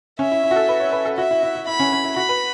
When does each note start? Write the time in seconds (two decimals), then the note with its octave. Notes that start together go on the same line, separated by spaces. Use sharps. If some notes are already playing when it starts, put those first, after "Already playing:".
0.19 C#4 E5
0.32 E4
0.43 E4
0.51 F#4
0.56 A4
0.69 B4
0.80 C#5
0.92 B4
1.05 A4
1.18 F#4 E5
1.31 E4
1.43 E4
1.55 E4
1.67 E4 B5
1.80 C#4
1.92 C#4
2.04 E4
2.16 F#4 B5
2.29 B4